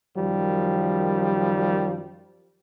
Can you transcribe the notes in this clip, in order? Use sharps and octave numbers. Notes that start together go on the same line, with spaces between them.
F#2 D#3 F3 G3